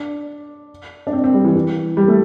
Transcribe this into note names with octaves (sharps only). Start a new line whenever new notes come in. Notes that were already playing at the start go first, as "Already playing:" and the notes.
Already playing: D4
D4
C4
C4
G3
E3
E3
G3
A3